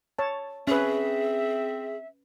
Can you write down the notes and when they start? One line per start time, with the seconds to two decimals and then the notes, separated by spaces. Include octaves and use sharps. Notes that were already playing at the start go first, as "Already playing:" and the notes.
0.19 C#5 A5
0.67 C4 C#4 G#4 B4 E5